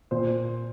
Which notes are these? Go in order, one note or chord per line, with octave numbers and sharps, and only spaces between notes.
A#2 C5